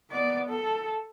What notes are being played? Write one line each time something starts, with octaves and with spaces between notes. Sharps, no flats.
B3 D5
A4